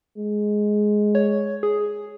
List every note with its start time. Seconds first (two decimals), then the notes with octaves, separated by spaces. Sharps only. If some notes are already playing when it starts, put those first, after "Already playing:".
0.18 G#3
1.15 C#5
1.63 G#4